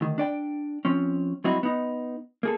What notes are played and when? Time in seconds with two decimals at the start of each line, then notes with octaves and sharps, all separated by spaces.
0.01 D2 D#3
0.18 D4 D5 G5
0.85 F3 C4 C#4
1.44 F#3 G3 C4 D#4 E4 F#4
1.63 B3 D#4
2.43 A#3 G#4 A4